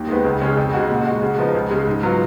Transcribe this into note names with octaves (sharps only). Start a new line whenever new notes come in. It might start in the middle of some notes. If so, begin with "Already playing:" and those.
Already playing: D#2
D#3 G#3 B3
C#2
C#3 G#3 C#4
F2
C#3 G#3 D#4 F#4
A#2
G#3 D#4 F#4
C#3
F3 B3 D#4
C#2
C#3 G#3
G#2
F#3 B3 F4